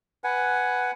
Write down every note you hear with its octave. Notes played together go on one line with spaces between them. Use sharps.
B4 F#5 G#5